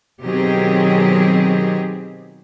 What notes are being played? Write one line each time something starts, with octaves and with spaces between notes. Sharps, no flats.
B2 D#3 F#3 C4 G4 G#4